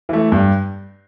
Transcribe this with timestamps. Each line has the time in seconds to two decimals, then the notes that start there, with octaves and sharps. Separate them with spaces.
0.09 E3 A3
0.32 G2